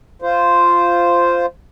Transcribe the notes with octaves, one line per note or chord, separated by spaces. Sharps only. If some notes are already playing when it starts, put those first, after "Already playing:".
F4 C5